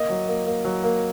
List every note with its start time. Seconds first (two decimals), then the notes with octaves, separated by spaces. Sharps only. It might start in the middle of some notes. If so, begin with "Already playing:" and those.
Already playing: A#3 D#5
0.10 F#3
0.28 A#3
0.47 A#3
0.65 F#3
0.84 A#3